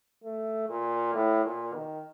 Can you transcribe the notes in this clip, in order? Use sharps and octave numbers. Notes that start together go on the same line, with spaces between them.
A3
A#2
A2
A#2
D#3